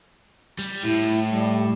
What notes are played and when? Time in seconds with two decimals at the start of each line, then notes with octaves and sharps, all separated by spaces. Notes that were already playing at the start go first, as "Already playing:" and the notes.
0.59 G3
0.83 A2 E4
1.30 G3